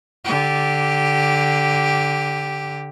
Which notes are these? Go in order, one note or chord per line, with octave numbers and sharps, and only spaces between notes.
D3 G4